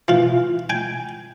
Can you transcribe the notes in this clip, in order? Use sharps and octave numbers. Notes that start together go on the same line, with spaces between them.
E3 F4
G5 G#5